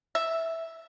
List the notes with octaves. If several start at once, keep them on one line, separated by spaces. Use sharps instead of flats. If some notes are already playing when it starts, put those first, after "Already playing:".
E5